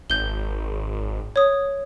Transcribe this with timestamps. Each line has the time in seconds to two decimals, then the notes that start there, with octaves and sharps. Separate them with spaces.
0.10 G#1 G6 G7
1.36 C#5 D#6